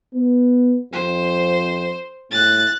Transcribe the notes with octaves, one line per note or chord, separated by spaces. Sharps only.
B3
F2 C5
A2 F#6 A6